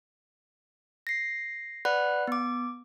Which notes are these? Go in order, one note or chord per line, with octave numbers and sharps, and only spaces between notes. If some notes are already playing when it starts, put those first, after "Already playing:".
A#6 C7
B4 D5 F#5 B5 F#6
B3 D6